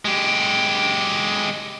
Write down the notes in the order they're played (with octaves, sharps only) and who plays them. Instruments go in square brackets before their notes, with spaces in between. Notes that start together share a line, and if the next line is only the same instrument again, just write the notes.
[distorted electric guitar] G#3 G4